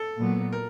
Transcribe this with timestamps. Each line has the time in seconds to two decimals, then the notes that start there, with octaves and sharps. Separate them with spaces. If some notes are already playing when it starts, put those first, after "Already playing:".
Already playing: A4
0.18 A#2 F#3 B3
0.52 A#4